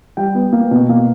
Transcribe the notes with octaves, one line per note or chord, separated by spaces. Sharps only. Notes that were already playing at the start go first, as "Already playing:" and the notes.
G3 G5
B3
A#3
B2
A#3